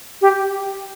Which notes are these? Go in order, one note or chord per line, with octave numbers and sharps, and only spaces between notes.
G4